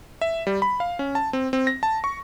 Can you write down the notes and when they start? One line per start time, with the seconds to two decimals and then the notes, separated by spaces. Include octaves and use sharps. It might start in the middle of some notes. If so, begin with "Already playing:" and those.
0.21 E5
0.47 G3
0.62 B5
0.80 F5
0.99 C#4
1.15 A5
1.33 C4
1.53 C4
1.67 A#6
1.83 A5
2.04 C#6